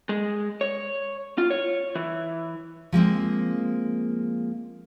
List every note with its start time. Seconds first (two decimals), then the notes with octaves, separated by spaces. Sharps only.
0.09 G#3
0.61 C#5
1.38 F4
1.51 C#5
1.95 E3
2.92 F3 G#3 A#3 C4